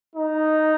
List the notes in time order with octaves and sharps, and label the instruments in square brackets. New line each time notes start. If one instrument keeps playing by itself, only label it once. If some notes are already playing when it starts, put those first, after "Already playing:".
[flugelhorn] D#4